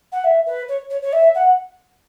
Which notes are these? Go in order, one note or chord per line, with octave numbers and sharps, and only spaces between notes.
F#5
E5
B4
C#5
C#5
C#5
E5
F#5